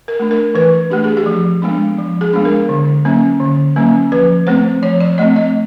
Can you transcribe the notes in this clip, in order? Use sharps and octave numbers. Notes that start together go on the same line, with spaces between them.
A#4
A3 D4
A#4
E3 B4
A3 D4 G4
G#4
G4
F3
G#3 B3 D4
F3
G#4
G#3 B3 D4
A#4
D3
F#3 A#3 C#4
D3
F#3 A#3 C#4
F3 B4
A3 C4 C5
F3 C#5
D5
A3 C4 D#5
D#5